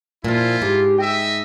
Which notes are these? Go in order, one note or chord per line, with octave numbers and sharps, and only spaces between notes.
A#2 F3 E4 F4
G#2 G4
D#5 E5 G5